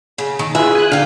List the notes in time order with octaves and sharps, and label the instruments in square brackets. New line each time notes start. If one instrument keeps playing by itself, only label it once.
[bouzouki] C#3
D#3
[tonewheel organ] E4 F4 B4 [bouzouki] G#4 E5
[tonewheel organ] G#5 F#6
[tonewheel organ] D3 D4 [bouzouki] F5 G5